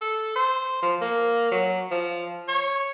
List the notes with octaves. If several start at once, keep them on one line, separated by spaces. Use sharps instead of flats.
A4
C5
F3
A#3
F#3
F3
C#5